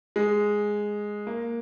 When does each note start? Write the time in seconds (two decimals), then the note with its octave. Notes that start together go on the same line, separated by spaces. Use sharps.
0.16 G#3
1.27 A#3